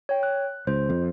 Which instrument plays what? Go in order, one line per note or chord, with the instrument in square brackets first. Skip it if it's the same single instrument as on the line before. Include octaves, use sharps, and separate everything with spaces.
[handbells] C#5 G5
F#6
[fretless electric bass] C#2 [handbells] C5
[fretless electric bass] F2